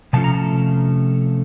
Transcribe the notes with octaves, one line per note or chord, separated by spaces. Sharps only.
C3 F3 A3 C#4 F4 A5
A#5
A5